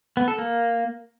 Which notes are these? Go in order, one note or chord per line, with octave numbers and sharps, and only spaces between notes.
B3
A4
A#3